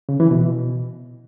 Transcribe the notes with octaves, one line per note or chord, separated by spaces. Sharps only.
C#3
E3
B2